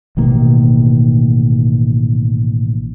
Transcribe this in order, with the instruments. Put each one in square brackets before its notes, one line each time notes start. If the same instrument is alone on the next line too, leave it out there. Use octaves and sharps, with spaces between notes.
[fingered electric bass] A1 B2 D#3 A#3